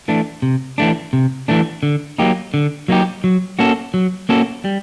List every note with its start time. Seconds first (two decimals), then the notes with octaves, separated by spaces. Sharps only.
0.08 E3 A3 D4
0.42 C3
0.78 E3 A3 D4
1.13 C3
1.48 E3 A3 D4
1.83 D3
2.19 F#3 A#3 D#4 G4
2.54 D3
2.88 F#3 A#3 D#4 G4
3.24 F#3
3.59 A#3 C#4 F#4 A4
3.94 F#3
4.29 A#3 C#4 F#4 A4
4.65 G3